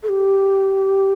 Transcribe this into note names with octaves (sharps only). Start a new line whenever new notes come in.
A4
G4